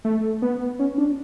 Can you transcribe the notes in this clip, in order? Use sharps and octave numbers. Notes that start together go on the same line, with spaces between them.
A3
B3
C#4
D4